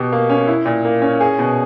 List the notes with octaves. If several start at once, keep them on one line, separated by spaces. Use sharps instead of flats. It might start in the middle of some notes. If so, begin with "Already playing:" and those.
Already playing: B2 G4
A#3
C#4
E4
A#2
A#3
C#4
G#4
B2